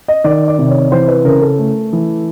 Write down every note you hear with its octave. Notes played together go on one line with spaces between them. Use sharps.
D#5
D#3 D5
D5
C3
C#5
E3 C5
B4
C#3 A#4
A4
A3
E3